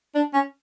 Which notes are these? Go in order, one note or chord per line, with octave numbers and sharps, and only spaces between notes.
D4
C#4